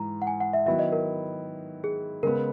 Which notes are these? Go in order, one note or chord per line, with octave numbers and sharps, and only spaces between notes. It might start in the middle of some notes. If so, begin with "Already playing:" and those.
Already playing: G#2 E3 A#5
F#5
G#5
F#5
E5
D#3 F#3 B3 E4 E5
D#5
A#4
G#4
C#3 G#3 B3 A#4